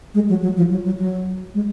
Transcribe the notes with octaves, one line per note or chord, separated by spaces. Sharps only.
G#3
F#3
F#3
F3
F#3
F#3
F#3
G#3